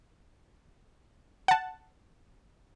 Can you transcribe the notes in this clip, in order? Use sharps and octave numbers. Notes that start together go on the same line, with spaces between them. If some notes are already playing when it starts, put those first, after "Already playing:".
F#5 A5